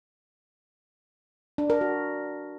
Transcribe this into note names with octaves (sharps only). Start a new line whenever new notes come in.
D4
A#4
F#4